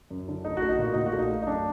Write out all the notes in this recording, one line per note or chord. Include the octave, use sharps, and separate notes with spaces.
F#2
D3
A3 D#4
A3 F#4
D#4
A#2 F#4
A#2 D#4
F#4
A3
D#4
A3
D#4
F#2 D4